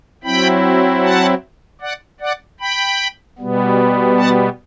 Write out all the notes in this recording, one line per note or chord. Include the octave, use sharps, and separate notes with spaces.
F#3 C4 E4 G5 B5
F#5 A5
D5 F#5
D5 F#5
G5 B5
B2 G3 B3
F#5 A5